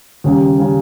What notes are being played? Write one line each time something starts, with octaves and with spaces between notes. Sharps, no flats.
D#2 C#3 G3 A#3 C#4
C#3 G3 A#3 C#4